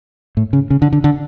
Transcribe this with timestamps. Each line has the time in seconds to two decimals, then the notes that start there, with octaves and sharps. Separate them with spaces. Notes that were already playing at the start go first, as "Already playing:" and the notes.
0.37 A2
0.53 C#3
0.70 C#3
0.82 D3
0.93 D3
1.04 D3